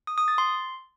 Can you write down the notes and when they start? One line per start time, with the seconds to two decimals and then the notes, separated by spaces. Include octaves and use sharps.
0.07 D#6
0.18 D#6
0.28 A6
0.38 C6